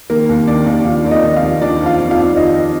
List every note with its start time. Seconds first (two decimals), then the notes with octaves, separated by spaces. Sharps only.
0.10 D#3 A#3 A#4
0.29 D#2
0.47 D#3 D4 D5
0.66 D#2 D4 D5
0.85 D#3 F4 F5
1.05 D#2 D5
1.11 D#4 D#5
1.24 D#3
1.36 F4 F5
1.43 D#2
1.62 D#3 D4 D5
1.80 F2
1.86 F4 F5
1.99 D#3
2.11 F4 F5
2.17 F2
2.36 D#3 D#4 D#5